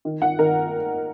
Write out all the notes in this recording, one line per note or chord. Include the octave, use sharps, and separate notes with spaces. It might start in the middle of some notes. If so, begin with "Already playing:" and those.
D#3
D#3 F#5
D#3 A#4